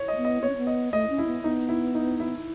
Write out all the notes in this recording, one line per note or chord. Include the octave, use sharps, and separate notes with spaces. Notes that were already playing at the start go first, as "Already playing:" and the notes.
Already playing: C#5
D#5
A3
B3
D#5
B3 C#5
C#4
B3
D#5
A3 D#5
C#4
E4
B3
B3 D#4
E4
D#4
E4